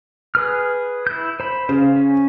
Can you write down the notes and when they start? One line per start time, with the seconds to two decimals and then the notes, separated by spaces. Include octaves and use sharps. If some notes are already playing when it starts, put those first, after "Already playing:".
0.35 G#4 B4 F6
1.07 E4 G6
1.40 C5 B5
1.69 C#3 C5 F5
1.96 C#4